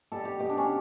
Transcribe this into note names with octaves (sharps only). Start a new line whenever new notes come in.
B2 G3 A4
G4
B2 G3 G4
D4
C#4